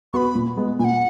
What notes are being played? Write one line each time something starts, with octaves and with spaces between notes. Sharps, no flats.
B3 F#4 B4 B5 C#6
A#2
G#3 B3
A#2 G#5
F#5